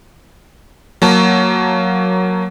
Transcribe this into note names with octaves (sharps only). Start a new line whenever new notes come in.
F#3 A#3 A5